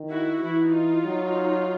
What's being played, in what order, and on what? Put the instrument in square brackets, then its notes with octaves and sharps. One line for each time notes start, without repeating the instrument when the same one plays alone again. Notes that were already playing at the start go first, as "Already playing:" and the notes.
Already playing: [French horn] D#3
[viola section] E4 F#4
[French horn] E3 [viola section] E4 F#4
[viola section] D#4 F4
[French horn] F#3